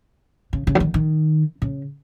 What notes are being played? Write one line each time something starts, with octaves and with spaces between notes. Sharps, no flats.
C#3
C#3
F#3
D#3
D#3
C#3